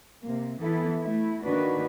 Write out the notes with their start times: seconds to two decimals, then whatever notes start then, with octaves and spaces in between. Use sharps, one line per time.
0.21 C3 A#3
0.61 E3 B3 E4 A4
1.00 A3 E4
1.43 D#3 A#3 D4 F#4 B4